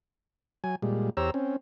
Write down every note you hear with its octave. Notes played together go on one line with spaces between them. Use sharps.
F#3 G#5
A#2 G3 G#3
E2 G4 C5 C#5 A#5 E6
C4 C#4